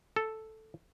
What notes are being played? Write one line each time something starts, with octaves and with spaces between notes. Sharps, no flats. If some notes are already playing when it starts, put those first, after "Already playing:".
A4